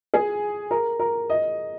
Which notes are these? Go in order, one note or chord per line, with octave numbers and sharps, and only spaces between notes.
G#4
A#4
A#4
D#5